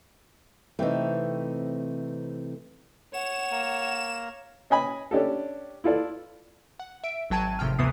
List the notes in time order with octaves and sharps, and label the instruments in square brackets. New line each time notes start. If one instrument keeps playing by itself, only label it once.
[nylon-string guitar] C3 E3 C4 [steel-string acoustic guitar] A3 D#4
[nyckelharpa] C#5 [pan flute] F#5 [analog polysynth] E7
[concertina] A#3 A#4
[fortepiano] C#4 D#5 G#5 B5
C#4 D4 G4 A4
E4 F4 A4 D5
[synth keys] F#5
E5 D7
G#1 F#3 G5 A5 G#6 D#7
G#1 A2 C3 F3 G5 F6
D2 C3 E3 B3 D#6 C7